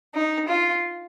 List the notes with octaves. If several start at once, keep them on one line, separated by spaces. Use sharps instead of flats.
D#4
F4